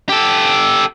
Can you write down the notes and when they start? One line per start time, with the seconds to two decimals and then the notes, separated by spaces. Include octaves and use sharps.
0.09 G4 A4